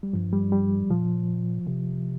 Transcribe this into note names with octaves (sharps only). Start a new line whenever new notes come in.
G3
G2 F3
G3
G3
A#2 F3
C3